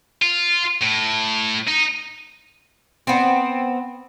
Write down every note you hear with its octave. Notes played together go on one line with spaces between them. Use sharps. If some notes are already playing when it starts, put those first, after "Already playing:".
F4
A2
D#4
B3 C4